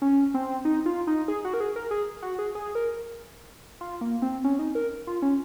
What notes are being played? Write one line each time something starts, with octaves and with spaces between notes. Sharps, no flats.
C#4
C4
D#4
F4
D#4
G#4
F#4
A#4
G#4
A#4
G#4
F#4
G#4
G#4
A#4
F4
A#3
C4
C#4
D#4
A#4
F4
C#4